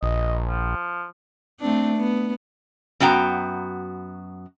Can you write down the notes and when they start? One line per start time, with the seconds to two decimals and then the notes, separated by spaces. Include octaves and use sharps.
0.03 A#1 D#5
0.48 F3
1.60 A3 C4 D4
1.97 B3
3.00 F#2 B3 F#4 G5 A#5